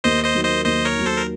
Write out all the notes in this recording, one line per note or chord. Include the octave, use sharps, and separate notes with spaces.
D#2 C5 D#5
C5 D#5
D#3 F#3
C5 D#5
D#2 C5 D#5
A#4 C#5
D#3 F#3
A4 C5
A#4